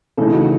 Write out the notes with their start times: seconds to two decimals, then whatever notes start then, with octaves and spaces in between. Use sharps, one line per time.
0.17 C#3 E3 A3 D#4 A4
0.34 F#4